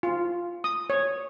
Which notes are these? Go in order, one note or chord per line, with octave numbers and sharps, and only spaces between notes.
F4
D#6
C#5